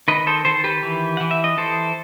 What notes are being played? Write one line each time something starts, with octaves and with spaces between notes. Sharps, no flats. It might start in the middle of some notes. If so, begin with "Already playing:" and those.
D#3 B4 D#5
A4 C5
D#3 A4 C5
G4 B4
E3
E3 F#5
E5
D#5
E3 A4 C5